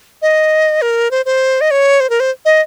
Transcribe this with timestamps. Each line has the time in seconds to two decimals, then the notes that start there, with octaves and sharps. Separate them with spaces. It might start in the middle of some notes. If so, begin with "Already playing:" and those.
0.22 D#5
0.82 A#4
1.11 C5
1.25 C5
1.61 D#5
1.71 C#5
2.00 C5
2.10 A#4
2.20 C5
2.45 D#5